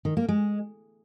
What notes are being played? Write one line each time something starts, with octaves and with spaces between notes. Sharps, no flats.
D#3
A#3
G#3